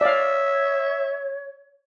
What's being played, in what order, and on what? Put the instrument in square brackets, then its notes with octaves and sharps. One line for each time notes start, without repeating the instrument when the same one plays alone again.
[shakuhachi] C#5 [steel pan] D5 F5 [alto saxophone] E5